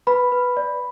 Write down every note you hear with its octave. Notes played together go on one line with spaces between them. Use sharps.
B4 B5
B4
D5